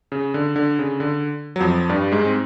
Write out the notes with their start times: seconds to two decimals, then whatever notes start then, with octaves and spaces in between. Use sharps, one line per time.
0.12 C#3
0.34 D3
0.56 D3
0.79 C#3
1.00 D3
1.56 F#3
1.60 F2 F3
1.89 G2 G3
2.12 G#2 G#3
2.25 C4